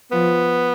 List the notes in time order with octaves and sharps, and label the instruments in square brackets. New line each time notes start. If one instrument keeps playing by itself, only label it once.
[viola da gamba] F3 [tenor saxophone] B3